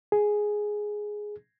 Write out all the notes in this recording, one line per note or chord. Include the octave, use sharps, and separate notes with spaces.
G#4